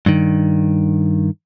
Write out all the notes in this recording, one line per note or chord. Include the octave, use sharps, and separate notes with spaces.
G2 D#3